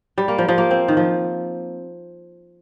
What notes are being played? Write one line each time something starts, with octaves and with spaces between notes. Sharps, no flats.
G3
A#3
F3
F3
A#3
C4
D#3
F3